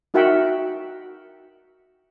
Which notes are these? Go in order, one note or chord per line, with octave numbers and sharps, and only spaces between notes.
D#4 F#4 A#4 E5 F#5 G5